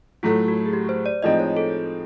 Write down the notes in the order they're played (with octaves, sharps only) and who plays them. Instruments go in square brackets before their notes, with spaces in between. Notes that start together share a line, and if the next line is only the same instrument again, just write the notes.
[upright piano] A2 F#3 A3 [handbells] F4
[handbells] F#4
G#4
G4
C5
D5
[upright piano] A2 F3 G#3 C4 D#4 [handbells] D#5
[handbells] C#5
A4